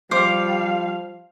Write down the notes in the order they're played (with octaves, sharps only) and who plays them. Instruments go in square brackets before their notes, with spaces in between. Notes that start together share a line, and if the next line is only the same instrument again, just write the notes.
[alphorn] F3 [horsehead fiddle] G3 F5 [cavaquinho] C5 D6